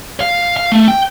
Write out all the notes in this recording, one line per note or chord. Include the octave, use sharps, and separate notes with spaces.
F5
F5
A3
G5